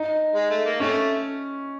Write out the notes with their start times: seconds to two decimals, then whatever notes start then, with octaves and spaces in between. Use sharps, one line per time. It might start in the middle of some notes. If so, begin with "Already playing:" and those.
Already playing: D#4
0.35 G#3
0.50 A3
0.65 A#3
0.80 C3 A3 C#4